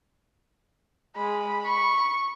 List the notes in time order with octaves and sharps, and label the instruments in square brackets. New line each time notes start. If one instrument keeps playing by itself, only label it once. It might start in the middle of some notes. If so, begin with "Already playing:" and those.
[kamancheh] G#3 [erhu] B5
[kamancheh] C#6